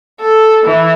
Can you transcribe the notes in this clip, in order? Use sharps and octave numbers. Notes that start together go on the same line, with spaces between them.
A4
E3